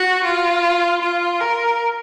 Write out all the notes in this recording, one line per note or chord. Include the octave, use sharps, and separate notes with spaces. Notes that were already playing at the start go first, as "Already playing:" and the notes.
Already playing: F#4
F4
F4
A#4